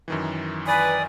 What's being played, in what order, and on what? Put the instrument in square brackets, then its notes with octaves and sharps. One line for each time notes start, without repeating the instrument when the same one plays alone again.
[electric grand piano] F#2 D#3 E3
[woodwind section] B4 [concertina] D5 D#6 [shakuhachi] G#5